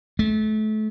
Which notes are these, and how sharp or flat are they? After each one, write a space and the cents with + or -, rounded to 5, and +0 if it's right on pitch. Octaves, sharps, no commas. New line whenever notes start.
A3 -30